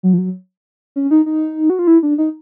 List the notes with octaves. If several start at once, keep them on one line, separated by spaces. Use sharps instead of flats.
F#3
F3
F#3
C#4
D#4
D#4
F#4
F4
E4
D4
D#4